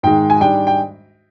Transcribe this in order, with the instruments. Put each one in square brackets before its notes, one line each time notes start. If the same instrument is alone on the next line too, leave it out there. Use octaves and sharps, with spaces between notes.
[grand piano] G#2 D#3 G#3 G5
G#5
G#2 G3 D4 G5
G5